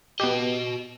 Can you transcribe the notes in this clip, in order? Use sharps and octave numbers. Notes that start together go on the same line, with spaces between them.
B3 F#4 G4 D#5